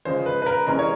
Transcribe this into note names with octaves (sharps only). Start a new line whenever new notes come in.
C#3 F3 G#3 C5
B4
B4
A#4
C3 E3 G#3 C#4 A#4
C#5